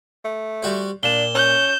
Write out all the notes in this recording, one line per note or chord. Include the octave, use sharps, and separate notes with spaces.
A3
G3 F#4 C5
A#2 D4 E7 G7
C#4 G6